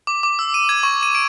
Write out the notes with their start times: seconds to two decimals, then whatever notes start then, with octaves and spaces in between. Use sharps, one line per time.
0.07 D6
0.23 D6
0.39 E6
0.54 D#7
0.69 G#6
0.83 C#6
1.03 D#7
1.15 D7